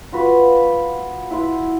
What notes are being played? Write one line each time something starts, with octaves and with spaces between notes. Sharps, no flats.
F4 F#4 B4
E4 F#5 C6